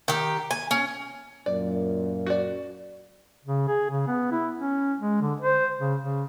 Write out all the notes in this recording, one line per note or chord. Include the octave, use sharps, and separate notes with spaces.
D#3 G4
G#5
C#4
F#2 A#2 D5
F#4 D5
C#3
G#4
C#3
B3
E4
C#4
G#3
D3
C5
C#3
C#3